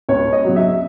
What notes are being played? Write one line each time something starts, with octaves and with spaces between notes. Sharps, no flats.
C#2 C#5
D#5
C#3 F#3
E5